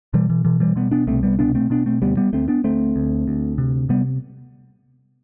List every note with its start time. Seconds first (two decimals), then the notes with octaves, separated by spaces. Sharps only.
0.14 B2 E3 G3
0.30 E3
0.45 B2 E3
0.60 E3 G3
0.76 B2 G3 B3
0.91 B3 D4
1.07 C2 A3 C4
1.23 G3 B3
1.39 B2 B3 D4
1.55 A3 C4
1.70 B2 B3 D4
1.86 A3 C4
2.02 D2 G3 B3
2.17 G3 B3
2.33 D2 A3 C4
2.48 B3 D4
2.64 D2 A3 C4
2.96 D2
3.28 D2
3.58 C3
3.89 C3 G3 B3